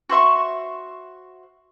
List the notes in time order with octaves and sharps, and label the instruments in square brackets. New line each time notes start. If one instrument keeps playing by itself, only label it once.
[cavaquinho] F#4 C5 E5 C#6